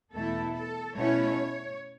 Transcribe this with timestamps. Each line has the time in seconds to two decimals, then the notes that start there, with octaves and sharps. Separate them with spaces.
0.13 E2 B2 A3 E4 A4
0.54 A4
0.96 B2 A3 C#4 E4 C#5